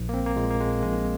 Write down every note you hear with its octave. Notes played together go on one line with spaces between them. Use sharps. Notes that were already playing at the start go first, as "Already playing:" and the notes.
Already playing: A#1
A#3
C4
A#3
A#2 G#3
A#3
G#3
A#1 G#3